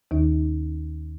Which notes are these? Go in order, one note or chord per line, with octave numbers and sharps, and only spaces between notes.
D#2 D#3 D#4